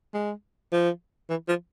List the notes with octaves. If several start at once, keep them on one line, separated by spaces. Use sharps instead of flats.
G#3
F3
E3
F3